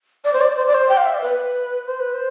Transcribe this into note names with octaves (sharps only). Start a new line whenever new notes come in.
D5
C5
D5
C5
D5
C5
G5
F5
E5
D5
B4
C5
B4
C5